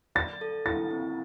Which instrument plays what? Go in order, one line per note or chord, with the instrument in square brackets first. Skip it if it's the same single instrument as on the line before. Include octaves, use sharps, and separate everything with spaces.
[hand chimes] D5 [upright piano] A6
[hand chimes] A4
[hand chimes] E4 [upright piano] A6
[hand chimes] C4